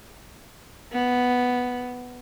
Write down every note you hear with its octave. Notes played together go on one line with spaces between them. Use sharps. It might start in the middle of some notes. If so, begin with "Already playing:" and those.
B3